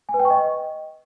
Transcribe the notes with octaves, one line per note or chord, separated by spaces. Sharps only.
G#5
B4
G5
C#6
D#5